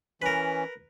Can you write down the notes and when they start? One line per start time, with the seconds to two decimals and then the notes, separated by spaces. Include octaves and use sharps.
0.22 E3 C#4 A#4 B4